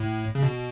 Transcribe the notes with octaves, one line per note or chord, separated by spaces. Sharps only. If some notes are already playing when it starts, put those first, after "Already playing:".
Already playing: A2
C#3
B2